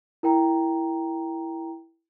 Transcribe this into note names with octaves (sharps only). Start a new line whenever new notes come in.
E4 A#4 G5 A#5